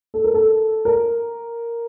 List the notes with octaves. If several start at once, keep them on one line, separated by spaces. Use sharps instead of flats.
A4
A#4
A4
A#4